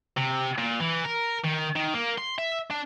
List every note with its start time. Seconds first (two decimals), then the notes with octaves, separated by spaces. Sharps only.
0.17 C3
0.58 A#2
0.80 E3
1.05 A#4
1.44 D#3
1.76 D#3
1.94 A#3
2.18 C6
2.38 E5
2.71 D4